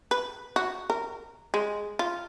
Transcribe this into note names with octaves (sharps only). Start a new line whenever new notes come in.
B4
F#4
A#4
G#3
F4